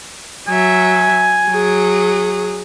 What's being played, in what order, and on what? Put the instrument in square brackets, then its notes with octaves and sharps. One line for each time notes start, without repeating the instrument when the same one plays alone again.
[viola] F#3 E5 [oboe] G#5
[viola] F#3 G#4